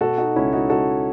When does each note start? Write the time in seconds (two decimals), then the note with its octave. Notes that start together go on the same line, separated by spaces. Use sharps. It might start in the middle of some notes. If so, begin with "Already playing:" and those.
0.01 B2 F#4 A4
0.18 D#4 F#4
0.36 C#2 C#4 E4
0.53 D#4 F#4
0.70 C#2 F#4 A4